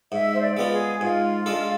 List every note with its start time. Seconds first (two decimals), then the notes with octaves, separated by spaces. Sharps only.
0.12 G#2 E5
0.34 C5
0.42 D5
0.57 G#3 B3 F4
0.72 G#4
1.01 G#2 F4
1.46 G#3 D4 A4